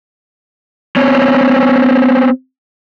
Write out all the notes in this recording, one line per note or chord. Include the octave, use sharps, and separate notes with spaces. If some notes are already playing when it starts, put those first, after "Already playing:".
B3 C4 C#5